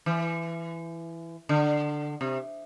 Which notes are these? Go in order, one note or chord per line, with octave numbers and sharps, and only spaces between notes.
E3
D3
C3